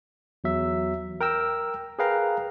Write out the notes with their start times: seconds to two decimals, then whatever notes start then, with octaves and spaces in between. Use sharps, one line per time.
0.44 E2 F#3 E5
1.21 A#4 G5 A#5 E6
1.99 G#4 A#4 B4 F5 G5 A#5